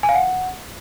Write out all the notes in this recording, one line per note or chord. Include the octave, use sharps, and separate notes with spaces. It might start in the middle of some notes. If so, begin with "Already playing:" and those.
G#5
F5
F#5